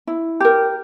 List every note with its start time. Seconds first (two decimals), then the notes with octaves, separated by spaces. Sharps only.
0.07 E4
0.40 G4 A#4